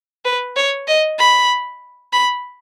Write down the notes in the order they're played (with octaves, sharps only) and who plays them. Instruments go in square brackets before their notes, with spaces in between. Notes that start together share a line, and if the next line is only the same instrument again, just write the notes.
[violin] B4
C#5
D#5
B5
B5